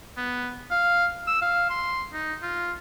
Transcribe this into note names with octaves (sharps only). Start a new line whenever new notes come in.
B3
F5
E6
F5
C6
D#4
F4